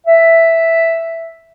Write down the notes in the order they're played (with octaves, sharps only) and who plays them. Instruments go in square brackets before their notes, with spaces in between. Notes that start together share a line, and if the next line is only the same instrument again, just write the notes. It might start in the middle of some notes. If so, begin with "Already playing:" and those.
[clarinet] E5